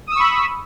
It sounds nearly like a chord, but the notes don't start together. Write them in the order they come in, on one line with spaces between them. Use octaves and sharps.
D#6 E6 C#6 B5